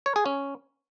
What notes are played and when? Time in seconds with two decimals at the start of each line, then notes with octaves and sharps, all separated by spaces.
0.06 C#5
0.16 G#4
0.26 C#4